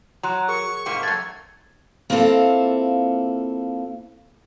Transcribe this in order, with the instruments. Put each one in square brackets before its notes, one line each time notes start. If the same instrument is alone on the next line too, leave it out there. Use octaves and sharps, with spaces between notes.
[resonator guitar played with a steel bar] F#3 [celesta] A#5 C6 F#6
[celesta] G#4 A#4 [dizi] C#6
[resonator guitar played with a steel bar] G#2 C3 A#3
[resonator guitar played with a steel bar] F#2 A3 [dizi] G#6 [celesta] A6
[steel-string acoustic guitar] A#3 C4 E4 F4 A4